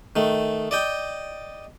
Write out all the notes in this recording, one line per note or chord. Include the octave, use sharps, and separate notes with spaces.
D#3 A3
D5 D#5 G5